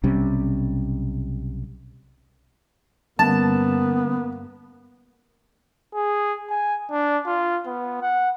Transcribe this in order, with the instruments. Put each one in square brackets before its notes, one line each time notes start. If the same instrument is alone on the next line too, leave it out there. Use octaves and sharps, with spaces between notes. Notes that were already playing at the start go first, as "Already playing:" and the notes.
[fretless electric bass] B1 C3 G3 C#4
[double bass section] G2 A#3 [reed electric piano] D3 G3 C#4 [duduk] B3 [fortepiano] A5
[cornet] G#4
G#5
D4
F4
B3
F#5